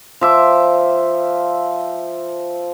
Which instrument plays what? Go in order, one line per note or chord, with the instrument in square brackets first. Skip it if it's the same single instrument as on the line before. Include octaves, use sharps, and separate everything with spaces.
[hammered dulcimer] F3 E5 D6